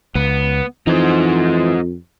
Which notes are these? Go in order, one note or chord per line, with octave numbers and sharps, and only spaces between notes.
C#2 B3
F2 E3 D#4 C5